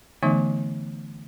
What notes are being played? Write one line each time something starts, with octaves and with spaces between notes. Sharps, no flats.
D3 E3 A3 B3 D#4 E5